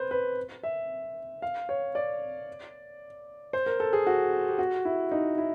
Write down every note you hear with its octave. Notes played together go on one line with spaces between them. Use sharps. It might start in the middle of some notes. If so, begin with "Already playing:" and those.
Already playing: B4 C5
B4
E5
F5
C#5
D5
C5
A#4
A4
G#4
F#4
G4
F#4
E4
D#4
E4